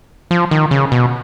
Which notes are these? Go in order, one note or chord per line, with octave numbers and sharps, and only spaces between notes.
F3
D#3
C#3
B2